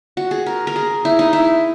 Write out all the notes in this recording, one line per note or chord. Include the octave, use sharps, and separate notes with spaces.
F#4
G#4
A#4
A#4
G#4
E4
D#4
E4